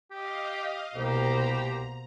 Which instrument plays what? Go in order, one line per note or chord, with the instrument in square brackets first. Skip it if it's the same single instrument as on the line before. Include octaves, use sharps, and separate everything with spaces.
[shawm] G4 [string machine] D#5 F5
[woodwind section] C2 [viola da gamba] B2 A#3 C5 [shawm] G4 [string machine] A#5